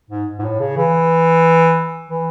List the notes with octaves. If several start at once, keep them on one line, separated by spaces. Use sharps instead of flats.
G#2
G#2
A2
C#3
E3
E3